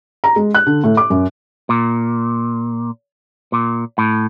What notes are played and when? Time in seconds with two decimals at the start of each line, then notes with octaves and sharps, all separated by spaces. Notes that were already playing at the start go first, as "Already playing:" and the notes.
0.24 A#5
0.36 G#3
0.55 F#6
0.67 D3
0.84 A2
0.97 D6
1.10 F#2
1.69 A#2
3.52 A#2
3.98 A2